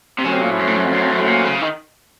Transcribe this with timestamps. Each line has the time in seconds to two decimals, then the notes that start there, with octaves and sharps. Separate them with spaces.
0.19 C3
0.25 C#3 F#3 A3 C#4 F#4 C5
0.33 C3
0.41 A#2
0.51 A2
0.59 F#2
0.67 A2
0.76 F#2
0.85 F2
0.92 F#2
1.02 F2
1.10 F#2
1.19 A2
1.27 A#2
1.45 C#3
1.62 D#3